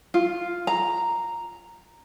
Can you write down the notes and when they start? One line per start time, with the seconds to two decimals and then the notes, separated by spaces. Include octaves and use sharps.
0.14 F4
0.67 A#5